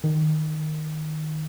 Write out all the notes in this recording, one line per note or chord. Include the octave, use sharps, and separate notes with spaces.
D#3